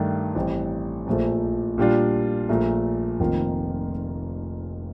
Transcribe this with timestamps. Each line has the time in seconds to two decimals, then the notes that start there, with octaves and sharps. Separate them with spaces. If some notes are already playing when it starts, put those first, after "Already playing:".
Already playing: G2 D#3 A3 D4
0.35 A1 A2 G3 C4
1.07 A#1 A#2 F3 A3
1.78 A#2 G3 D4 F4
2.49 A#1 A#2 A3
3.20 F1 F2 D#3 A#3 F4